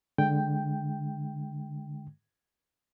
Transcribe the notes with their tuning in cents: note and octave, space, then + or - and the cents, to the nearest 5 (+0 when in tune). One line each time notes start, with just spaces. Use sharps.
D3 +5 G#3 +0 G5 +0